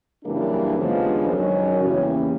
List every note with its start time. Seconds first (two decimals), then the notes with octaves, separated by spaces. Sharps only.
0.24 F#2 C#3 E3 G3 A#3 D4
0.76 D#2 C#3 F3 G#3 B3 D4
1.27 F#2 D#3 F#3 C#4
1.79 E2 C#3 E3 G3 A#3